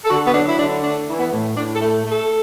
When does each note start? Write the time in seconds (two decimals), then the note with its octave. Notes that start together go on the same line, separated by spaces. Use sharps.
0.05 A4
0.10 D3 F#4
0.27 B3
0.34 F#3 D4
0.49 E4
0.59 D3 D4
0.83 A3 D4
1.08 E3
1.19 B3
1.32 A2
1.57 A2 D4
1.75 A4
1.81 A3
2.05 A3
2.11 A4